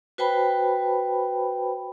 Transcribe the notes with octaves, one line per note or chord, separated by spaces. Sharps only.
F#4 B4 C5 G5 A5 B5